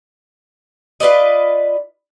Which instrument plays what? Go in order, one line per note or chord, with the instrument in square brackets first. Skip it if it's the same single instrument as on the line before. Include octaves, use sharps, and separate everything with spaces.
[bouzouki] F4 B4 D5 D#5